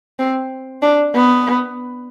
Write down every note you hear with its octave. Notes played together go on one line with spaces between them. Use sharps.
C4
D4
B3